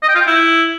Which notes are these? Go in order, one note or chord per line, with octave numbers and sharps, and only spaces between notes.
D#5
G5
F4
G5
E4